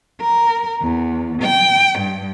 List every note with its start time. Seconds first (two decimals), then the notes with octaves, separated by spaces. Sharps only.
0.21 A#4
0.82 E2
1.43 G5
1.99 G2